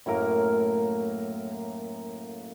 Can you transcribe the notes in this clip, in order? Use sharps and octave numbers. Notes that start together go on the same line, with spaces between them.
F#2 A2 A#3 A#4